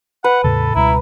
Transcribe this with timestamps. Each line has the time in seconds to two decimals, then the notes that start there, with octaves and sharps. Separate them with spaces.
0.24 B4 F#5
0.44 E2 A2 C#3 A4
0.76 C#2 B2 G3 E4 A#5